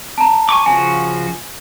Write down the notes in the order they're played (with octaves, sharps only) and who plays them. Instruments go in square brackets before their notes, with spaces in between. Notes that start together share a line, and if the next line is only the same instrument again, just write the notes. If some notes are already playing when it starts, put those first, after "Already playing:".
[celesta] A5 A#5
[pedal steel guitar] G#5 C#6 D6
[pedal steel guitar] C#3 F3 F#4 [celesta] G#5